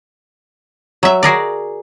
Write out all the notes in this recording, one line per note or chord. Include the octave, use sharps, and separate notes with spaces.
F#3 E5
F#4 G#4 A#4 D5